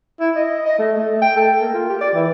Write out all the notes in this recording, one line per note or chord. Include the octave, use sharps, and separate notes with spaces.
E4
D#5
D#5
A3
A3
G5
A4
A#3
F4
G4
D5
E3